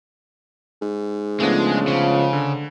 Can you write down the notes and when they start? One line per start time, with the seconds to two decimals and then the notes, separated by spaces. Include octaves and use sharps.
0.82 G#2
1.40 C#2 F3 G#3 A3 B3 D4
1.87 C#3
2.33 D3